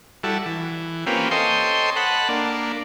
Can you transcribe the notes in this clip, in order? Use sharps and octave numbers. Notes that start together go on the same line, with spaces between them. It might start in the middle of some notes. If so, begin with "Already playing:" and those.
G3 E4 F#4 A4
E3
A#3 C4 C#4 F4 G4 B4
A4 C5 C#5 D#5 G5 C6
F#5 A5 B5
A#3 D4